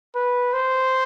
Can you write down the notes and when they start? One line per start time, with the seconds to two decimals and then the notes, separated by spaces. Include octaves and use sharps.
0.16 B4
0.54 C5